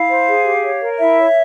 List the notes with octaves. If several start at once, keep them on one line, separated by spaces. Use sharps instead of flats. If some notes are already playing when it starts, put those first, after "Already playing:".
Already playing: E4 F5
C5
G#4
G4
C#5
A#4
E4 E5
C#5